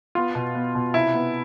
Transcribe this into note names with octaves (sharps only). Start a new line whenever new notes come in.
B3 F4
B2
B3
B2
C3 E4
B3